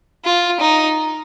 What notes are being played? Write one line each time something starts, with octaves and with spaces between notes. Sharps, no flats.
F4
D#4